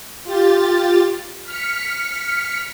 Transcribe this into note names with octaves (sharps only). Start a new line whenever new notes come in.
F4 G4 A6
F6 B6 C#7